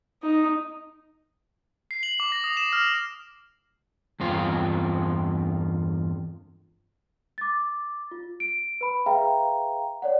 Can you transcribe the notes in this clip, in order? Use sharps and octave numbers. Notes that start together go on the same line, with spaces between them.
D#4
C7
F#7
D6
A#6
D#6
E7
F6
E2 G2 C4 F4
D6 A6
F4
D7
B4 B5
G#4 B4 E5 F5 G5 A#5
C#5 D5 F#5